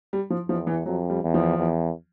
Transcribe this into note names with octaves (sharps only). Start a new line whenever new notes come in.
G3
F3
E2 F3
E3
F2 F#3
G3
E2
F3
E2